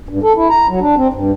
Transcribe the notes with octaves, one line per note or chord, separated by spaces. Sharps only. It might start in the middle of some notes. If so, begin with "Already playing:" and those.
G2
A4
E4
A#5
F#3
D4
C4
G2